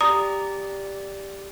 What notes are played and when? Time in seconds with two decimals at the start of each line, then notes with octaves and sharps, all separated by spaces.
0.01 G4 D5 A#5 D#6